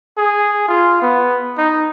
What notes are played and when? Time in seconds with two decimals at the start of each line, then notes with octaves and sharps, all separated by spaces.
0.18 G#4
0.68 F4
1.02 B3
1.58 D#4